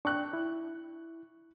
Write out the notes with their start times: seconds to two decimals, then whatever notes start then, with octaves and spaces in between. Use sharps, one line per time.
0.05 D4 G5 C#6 F#6
0.33 E4